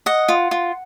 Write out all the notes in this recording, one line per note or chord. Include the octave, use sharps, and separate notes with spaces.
D#5 F#5
F4
F4